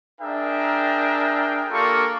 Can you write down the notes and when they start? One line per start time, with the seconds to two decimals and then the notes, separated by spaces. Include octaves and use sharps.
0.21 D4 G#4 A#4 E5 G5
1.70 A#3 D4 F4 G4 A4 C#6